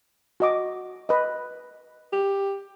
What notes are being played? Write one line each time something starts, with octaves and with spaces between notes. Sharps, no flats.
F#4 D#5 D6
B4 D#5
G4